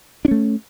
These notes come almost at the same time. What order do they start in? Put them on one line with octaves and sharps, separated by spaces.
D4 C#4 A3